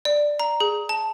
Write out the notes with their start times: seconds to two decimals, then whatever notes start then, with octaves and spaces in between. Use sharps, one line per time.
0.05 D5
0.40 A#5
0.60 G#4
0.89 A5